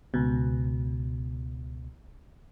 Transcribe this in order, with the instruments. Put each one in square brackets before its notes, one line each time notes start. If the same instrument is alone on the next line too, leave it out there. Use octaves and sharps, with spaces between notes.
[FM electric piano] C#2 B2